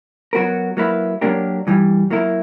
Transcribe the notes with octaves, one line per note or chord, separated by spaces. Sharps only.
F#3 B3 F#4 A#4
F#3 A#3 E4 B4
F#3 A#3 D4 G4 A#4
G2 E3 G3
F#3 A#3 E4 A#4